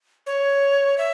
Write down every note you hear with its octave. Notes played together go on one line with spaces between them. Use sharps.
C#5
E5